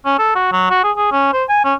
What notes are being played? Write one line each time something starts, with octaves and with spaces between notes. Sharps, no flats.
C#4
A4
F#4
F#3
F#4
G#4
G#4
C#4
C5
G#5
C#4